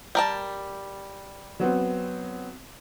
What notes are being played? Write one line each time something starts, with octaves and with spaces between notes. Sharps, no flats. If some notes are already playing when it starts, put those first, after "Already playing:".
G3 A#4 A5
F#3 B3 C4